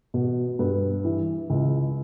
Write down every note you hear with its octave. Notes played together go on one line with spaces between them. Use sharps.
B2
G2 B4
E3
C#2